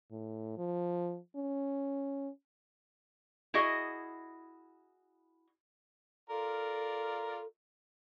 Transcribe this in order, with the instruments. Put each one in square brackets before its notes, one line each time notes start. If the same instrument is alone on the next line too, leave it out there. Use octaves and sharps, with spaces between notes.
[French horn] A2
F3
C#4
[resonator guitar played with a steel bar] E4 F#4 G#4 D#5
[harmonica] F4 A#4 D5 [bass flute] A4